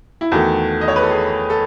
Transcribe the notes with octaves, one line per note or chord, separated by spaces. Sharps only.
E4
E2 D#3 A3 F#4
D#5
C#5
B4
A4
G#4
A4